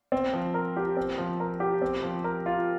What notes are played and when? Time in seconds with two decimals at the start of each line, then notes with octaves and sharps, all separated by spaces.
0.12 C4
0.34 F3
0.54 A#4
0.77 G4
0.97 C4
1.18 F3
1.40 A#4
1.60 G4
1.82 C4
2.03 F3
2.24 A#4
2.46 F4